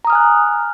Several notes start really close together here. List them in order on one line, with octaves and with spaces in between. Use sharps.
A#5 D#6 F6 G#5 F#6